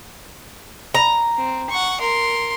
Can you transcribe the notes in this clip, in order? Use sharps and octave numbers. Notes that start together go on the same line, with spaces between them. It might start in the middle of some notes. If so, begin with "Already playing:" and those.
A#5
C4
F#5 C#6
A#4 C6